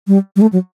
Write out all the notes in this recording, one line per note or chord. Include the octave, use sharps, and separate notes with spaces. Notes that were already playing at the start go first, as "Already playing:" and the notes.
G3
G3
A3
F#3